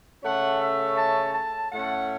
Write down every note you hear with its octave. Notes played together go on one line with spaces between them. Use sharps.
C#3 A3 C#4 F#5
E5
A5
A5
A2 A3 C#4 F#5